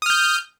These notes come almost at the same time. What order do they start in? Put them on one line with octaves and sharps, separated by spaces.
D#6 F6 G6